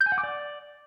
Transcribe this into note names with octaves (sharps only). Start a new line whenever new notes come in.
G6
G#5
F#5
D6
D5